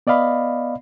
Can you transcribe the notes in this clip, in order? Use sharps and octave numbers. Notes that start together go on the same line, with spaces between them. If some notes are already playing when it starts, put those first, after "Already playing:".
B3 D5 D#5 F5 B5